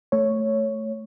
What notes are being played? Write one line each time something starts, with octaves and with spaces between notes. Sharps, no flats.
A3 C#5